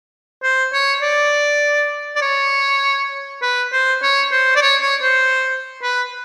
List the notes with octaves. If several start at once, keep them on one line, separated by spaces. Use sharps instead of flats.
C5
C#5
D5
D5
C#5
B4
C5
C#5
C5
D5
C#5
C#5
C5
B4